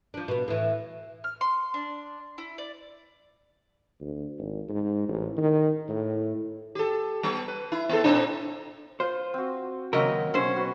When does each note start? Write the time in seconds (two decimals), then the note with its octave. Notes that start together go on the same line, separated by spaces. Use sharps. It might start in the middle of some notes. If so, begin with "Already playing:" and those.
0.14 F3 D4
0.28 B2 B3
0.48 A2 E3
1.24 F6
1.41 C6
1.74 D4
2.38 E4
2.58 D5
4.01 D2
4.38 G#1
4.69 G#2
5.09 A1
5.37 D#3
5.89 A2
6.75 G4 A4
7.23 G3 B3
7.48 B4
7.72 E4
7.89 B3 E4 A4
8.04 A#2 C4 D4
9.00 F4 C5
9.34 C4 F#4
9.93 D#2 C#3 F#3 A#3 C4 A#4 D#5 F#5
10.34 B1 C#4 C5 G#5
10.56 C4 F#4 B4